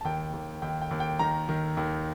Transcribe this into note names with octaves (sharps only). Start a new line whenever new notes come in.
A5
D#2 G5
D#2
D#2 G5
G5
D#2
G5
D#3 A#5
D#3
D#2